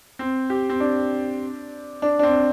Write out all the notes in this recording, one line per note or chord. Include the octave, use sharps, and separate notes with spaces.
C4
G4
C4
D4
D4
D4
C4